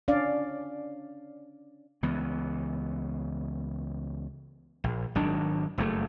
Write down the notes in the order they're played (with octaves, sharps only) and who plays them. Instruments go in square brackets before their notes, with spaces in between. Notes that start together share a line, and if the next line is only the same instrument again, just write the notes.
[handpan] C#4 D4 D5 F5
[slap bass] C#2 E3 B3
A#1
G#1 D#3 F#3 D4
F#1 G2 C3 A3